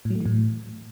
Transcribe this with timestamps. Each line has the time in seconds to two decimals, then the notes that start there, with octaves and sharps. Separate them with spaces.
0.05 A2
0.10 F#3
0.15 A3
0.20 E3
0.26 A2